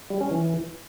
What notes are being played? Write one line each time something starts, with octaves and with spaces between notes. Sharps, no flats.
G3
C#4
E3